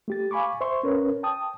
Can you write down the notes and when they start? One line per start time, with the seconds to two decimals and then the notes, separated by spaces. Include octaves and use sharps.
0.08 A3 G4 A6
0.31 F5 G#5 B5 C#6 D6
0.61 C5 E5 C6 C#6
0.83 C#4 A#4 B4 C#5
1.23 G5 A5 D#6